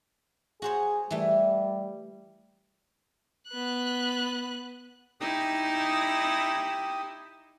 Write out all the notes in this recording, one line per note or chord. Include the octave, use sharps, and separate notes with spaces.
F#4 G#4 C5 C#5
E3 G3 A3
B3 F#6
D#4 E4 G4 D#6